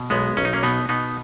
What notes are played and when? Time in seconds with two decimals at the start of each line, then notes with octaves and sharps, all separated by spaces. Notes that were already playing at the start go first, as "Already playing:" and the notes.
Already playing: B2
0.10 B1 G#3 B3
0.37 B1 C#4
0.45 D#4
0.53 A#3 C#4
0.63 B2 B3 D#4
0.89 B2 B3 D#4